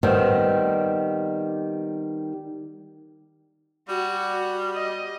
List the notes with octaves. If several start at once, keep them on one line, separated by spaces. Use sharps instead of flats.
D#3 G3 B3 C4
G3 F#4
D#5